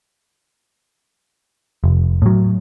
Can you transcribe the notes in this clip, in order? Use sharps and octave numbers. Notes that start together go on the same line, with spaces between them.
F1
A2 F#3